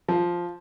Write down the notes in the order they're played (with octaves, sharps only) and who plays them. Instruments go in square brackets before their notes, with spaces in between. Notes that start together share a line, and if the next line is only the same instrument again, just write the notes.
[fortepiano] F3